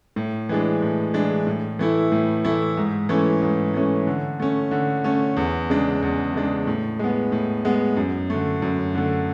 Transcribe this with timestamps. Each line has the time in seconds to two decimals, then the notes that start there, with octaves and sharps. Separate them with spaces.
0.16 A2
0.49 E3 G#3 D4
0.82 A2
1.14 E3 G#3 D4
1.47 A2
1.79 E3 A3 E4
2.12 A2
2.45 E3 A3 E4
2.77 G#2
3.09 E3 A3 C#4
3.42 G#2
3.74 E3 A3 C#4
4.07 D3
4.40 A3 C#4
4.71 D3
5.04 A3 C#4
5.36 E2
5.70 C#3 G#3 D4
6.02 E2
6.34 C#3 G#3 D4
6.67 A2
6.99 G#3 B3
7.32 A2
7.65 G#3 B3
7.97 F#2
8.30 D3 A3
8.62 F#2
8.95 D3 A3